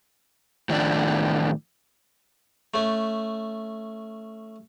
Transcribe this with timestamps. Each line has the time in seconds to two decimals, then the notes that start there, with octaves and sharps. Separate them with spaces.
0.69 A2 D#3 F3 D4 D5
2.74 A3 C#4